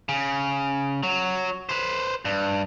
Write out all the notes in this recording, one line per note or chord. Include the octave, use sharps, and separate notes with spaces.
C#3
F#3
B4 C5
G2